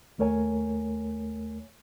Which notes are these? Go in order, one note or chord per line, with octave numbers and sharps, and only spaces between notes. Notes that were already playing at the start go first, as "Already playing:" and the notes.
D#2 A3 A#4 C#5 G#5